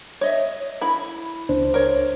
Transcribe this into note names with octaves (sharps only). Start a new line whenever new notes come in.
C#5 D#5 E5
E4 B5
C#2 D4 C5
A#4 C#5